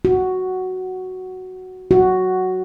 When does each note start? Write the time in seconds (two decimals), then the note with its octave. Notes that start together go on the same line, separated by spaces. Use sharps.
0.05 F#4
1.91 F#4